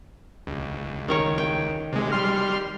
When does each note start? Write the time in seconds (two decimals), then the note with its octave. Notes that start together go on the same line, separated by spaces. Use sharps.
0.47 C#2
1.08 D#3 A#4 C#5
1.38 G5
1.92 C3 G#3
2.12 G3 C6 F6